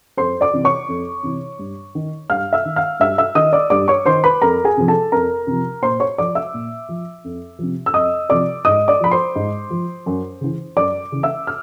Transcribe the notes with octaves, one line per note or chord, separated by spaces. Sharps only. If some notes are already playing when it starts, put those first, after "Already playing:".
F2 C5 C6
D5 D6
C3 E3
C#5 C#6
F2
C3 E3
G2
D#3
G2 F5 F6
E5 E6
D#3
F5 F6
G2 E5 E6
E5 E6
D#3 D#5 D#6
D5 D6
G2 D5 D6
C#5 C#6
D#3 C5 C6
B4 B5
F2 A#4 A#5
G#4 G#5
C3 F3
A4 A5
F2 A#4 A#5
C3 F3
A#2 C5 C6
C#5 C#6
F3 D5 D6
E5 E6
A#2
F3
F2
C3 F3
E6
F2 D#5 D#6
C3 F3 D5 D6
G#2 D#5 D#6
D5 D6
F3 B5
C5 C6
G#2
F3
F#2
C#3 E3
F#2 D5 D6
C#3 E3
E5 E6
F6